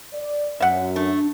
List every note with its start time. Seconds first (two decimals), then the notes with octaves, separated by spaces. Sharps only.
0.12 D5
0.61 F#2 E5 F#5
0.96 A3 D4